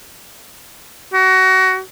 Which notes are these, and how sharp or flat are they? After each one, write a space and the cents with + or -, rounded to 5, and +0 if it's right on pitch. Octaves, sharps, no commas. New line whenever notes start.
F#4 +25